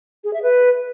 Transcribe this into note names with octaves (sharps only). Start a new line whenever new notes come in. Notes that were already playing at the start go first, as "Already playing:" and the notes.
G#4
E5
B4